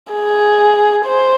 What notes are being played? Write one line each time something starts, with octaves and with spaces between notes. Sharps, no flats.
G#4
C5